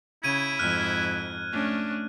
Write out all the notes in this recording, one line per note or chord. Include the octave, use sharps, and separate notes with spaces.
C#3 E4 G#6 D#7
F2 G#2 F6 F#6
A3 C#4 D4